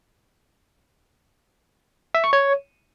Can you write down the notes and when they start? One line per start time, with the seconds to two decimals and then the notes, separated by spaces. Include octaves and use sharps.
2.15 E5
2.24 C#6
2.33 C#5